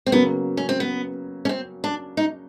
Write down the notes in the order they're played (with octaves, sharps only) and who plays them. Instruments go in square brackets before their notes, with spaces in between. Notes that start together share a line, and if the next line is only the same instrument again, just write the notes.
[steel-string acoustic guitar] C4
[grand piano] C#3 F#3 A#3 [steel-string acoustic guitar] B3
[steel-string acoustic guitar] C#4
C4
B3
C#4
C4
D4
D#4